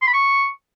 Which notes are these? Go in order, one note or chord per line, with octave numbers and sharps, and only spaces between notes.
C6
B5
C#6